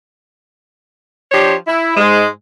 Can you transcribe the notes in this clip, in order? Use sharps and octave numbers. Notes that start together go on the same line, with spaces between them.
F3 D4 G4 C5 C#5
E4
G#2 G#3